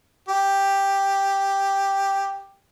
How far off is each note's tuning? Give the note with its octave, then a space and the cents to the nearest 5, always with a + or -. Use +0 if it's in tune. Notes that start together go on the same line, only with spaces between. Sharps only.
G4 +5